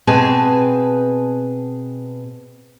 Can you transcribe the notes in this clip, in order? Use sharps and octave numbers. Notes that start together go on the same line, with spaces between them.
B2 C4 G#4 B4 G#5 A5